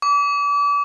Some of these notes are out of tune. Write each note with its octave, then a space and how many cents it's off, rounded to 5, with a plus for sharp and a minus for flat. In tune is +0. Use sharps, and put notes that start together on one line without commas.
D6 -35